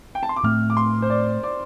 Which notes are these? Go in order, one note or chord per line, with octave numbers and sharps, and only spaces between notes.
G5
A5
C6
D6
A2 A3 C4 F6
D6
C6
C5
D5
D5